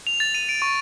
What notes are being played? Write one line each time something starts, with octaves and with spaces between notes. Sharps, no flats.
F7
A6
D#7
D7
C#6